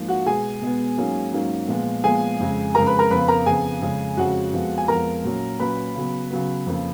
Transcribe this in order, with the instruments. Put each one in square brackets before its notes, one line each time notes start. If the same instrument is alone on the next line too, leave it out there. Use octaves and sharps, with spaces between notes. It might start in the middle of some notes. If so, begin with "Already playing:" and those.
Already playing: [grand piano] G#2 F3 A#3
F#4 F#5
B2 G#3 B3 G#4 G#5
B2 G#3 B3
G#2 F#3 A#3 C#4
G#2 F#3 A#3 C#4
A#2 F3 G#3 B3
A#2 F3 G#3 B3 G#4 G#5
F2 C#3 G#3
F2 C#3 G#3 A#4 A#5
B4 B5
A#4 A#5
F2 C#3 F3 B3 B4 B5
A#4 A#5
F2 C#3 F3 B3 G#4 G#5
F2 C#3 G#3 C#4
F2 C#3 G#3 C#4 F#4 F#5
F2 F3 G#3 B3
G#5
F2 F3 G#3 B3 A#4 A#5
A#2 F#3 C#4
A#2 F#3 C#4 B4 B5
C#3 F#3 B3
C#3 F#3 B3
F2 C#3 F3 A#3